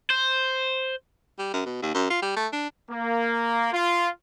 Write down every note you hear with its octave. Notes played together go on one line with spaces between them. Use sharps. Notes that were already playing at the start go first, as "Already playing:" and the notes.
C5
G3
F#2
B2
D#2
F#2
F4
G3
A3
D4
A#3
F4